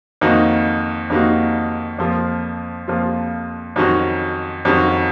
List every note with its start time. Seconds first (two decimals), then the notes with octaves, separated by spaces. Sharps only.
0.21 F2 D#3 A#3 D#4 F#4
1.10 F2 D#3 A#3 D#4 F#4
1.98 F2 F3 A#3 F4
2.88 F2 F3 A#3 F4
3.76 F2 D#3 F#3 C#4 F#4
4.65 F2 D#3 F#3 C#4 F#4